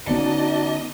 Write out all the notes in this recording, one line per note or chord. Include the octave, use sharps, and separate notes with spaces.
D3 B3 C#4 D#4 F#4 D5 D#5 A5